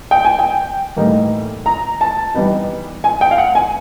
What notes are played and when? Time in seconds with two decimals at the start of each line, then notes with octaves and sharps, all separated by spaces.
0.11 G5
0.25 G#5
0.39 G5
0.96 A2 E3 G3 A#3 D#4
1.66 A#5
2.01 A5
2.34 E3 G3 B3 D#4
3.04 G#5
3.21 G5
3.31 F5
3.38 F#5
3.55 G#5